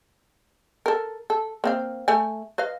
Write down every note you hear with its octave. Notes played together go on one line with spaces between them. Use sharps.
A4 A#4
A4
A#3 C4 F5
A3 G#5
B4 D#5 F5